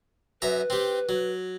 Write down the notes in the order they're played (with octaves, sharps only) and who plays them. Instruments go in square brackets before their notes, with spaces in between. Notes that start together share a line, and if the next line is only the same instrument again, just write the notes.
[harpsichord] F#2 E5 A#5 [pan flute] B4
[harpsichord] C4 G4
F#3